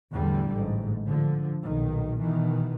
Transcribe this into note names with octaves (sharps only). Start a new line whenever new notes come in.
E2 A2 D3 G3
A1 G#2
D3 F3
B1 A#2 D#3
B2 D#3 E3